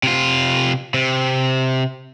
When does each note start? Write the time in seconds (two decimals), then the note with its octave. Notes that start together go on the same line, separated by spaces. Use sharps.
0.03 C3 F4
0.94 C3